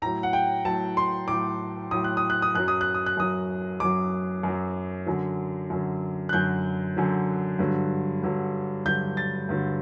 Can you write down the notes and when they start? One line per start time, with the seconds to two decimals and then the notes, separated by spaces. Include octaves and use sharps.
0.02 A2 F#3 A#5
0.23 F#5
0.33 G5
0.65 A2 F#3 A5
0.97 C6
1.28 A2 F#3 D6
1.91 A2 F#3 D#6
2.04 F#6
2.17 D#6
2.30 F#6
2.42 D#6
2.55 F#2 F#3 F#6
2.68 D#6
2.81 F#6
2.94 D#6
3.06 F#6
3.17 F#2 F#3 D#6
3.80 F#2 F#3 D6
4.43 F#2 F#3
5.07 F#2 D3 F#3
5.70 F#2 D3 F#3
6.29 F#6
6.33 F#2 D3 F#3 G6
6.96 F#2 D3 F#3
7.59 G2 D3 F#3
8.23 G2 D3 F#3
8.86 G2 D3 F#3 G6
9.17 A6
9.49 G2 D3 F#3